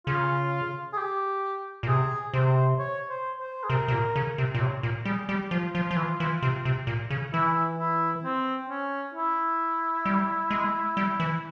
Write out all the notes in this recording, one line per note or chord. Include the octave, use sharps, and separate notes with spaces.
C#3 F4
G#4
G4
A#2
C3 G#4
C3 C5
C#5
C5
C5
G#4
C3 A#4
C3
A#2
C#3
C3
A#2
C3 C#5
A#2
G3 G#4
G3 G4
F3 F4
F3
F3
E3
E3
C3
C3
A#2
C#3
E3 E4
E4
C4
C#4
E4
G3
G#3
G3
E3